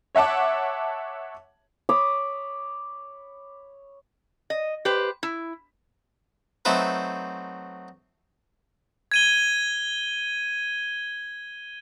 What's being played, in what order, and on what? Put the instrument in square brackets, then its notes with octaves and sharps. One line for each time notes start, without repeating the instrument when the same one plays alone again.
[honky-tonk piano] C#5 E5 F#5 A5 D6
[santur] C#5 B5 D6 D#6
[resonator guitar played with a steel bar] D#5
G4 B4 C5
E4
[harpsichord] F#3 A3 C4 D#4 B4 C5
[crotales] G#6 D#7 G7